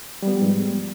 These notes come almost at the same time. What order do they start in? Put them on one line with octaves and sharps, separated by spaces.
G3 B3 F3 G#3 G#2